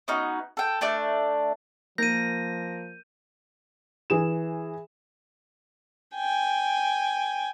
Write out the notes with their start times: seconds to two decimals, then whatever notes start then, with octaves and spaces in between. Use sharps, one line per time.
0.08 B3 C#4 D#4 F#4
0.57 A4 G5
0.81 A3 D4 D5
1.98 F3 A#3 A#4 G6 A#6 D#7
4.10 E3 G#4 E7
6.15 G5 G#5